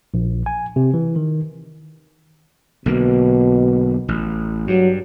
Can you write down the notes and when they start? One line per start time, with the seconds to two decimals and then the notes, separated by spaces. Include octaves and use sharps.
0.14 A#1
0.46 G#5
0.76 C3
0.94 E3
1.16 D#3
2.86 B1 B2 D3 A#3
4.08 A1
4.67 G2 F#3